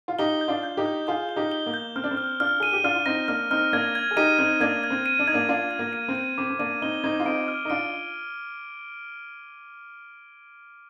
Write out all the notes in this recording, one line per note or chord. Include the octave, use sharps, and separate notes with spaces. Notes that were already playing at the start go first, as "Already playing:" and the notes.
F4
D#4 G4 G7
G6
D4 F4
G6
D#4 G4
G6
F4 G#4 G6
G7
D#4 G4
G7
A#3
G6
C4 F6
D4
C4
F6
D4 F4 F6
G#4 D#7
G4
D4 F4 F6
F4
C4 D#4 A#6
A#3 D4 F6
C4 D#4 F6
A#3 D4 G#6
G#6
G#4
D#4 G4 D#7
C4 D#4 G#6
A#3 D4 G#6
G#6
C4
D#7
D4
D#4 G#6
A#3 D4
D4 F4 G#6
G#6
A#3
D#7
C4
D#7
C4 D6
C4
A#3 D4 D#7
C4 D#4 G7
C4 D#4 G#6
F4
C4 D#4 D7
F6
D#4
D4 F4 D7